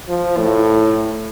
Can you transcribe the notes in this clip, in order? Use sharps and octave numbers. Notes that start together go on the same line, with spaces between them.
F3
A2